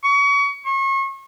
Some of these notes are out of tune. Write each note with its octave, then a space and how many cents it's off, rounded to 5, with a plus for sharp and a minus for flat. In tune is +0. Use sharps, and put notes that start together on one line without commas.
C#6 +30
C#6 -35